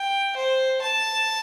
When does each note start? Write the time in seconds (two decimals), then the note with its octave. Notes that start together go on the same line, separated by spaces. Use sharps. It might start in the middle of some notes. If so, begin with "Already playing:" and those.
Already playing: G5
0.36 C5
0.81 A5